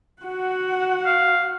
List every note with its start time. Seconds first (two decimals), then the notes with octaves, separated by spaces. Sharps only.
0.22 F#4 F#5
1.06 F5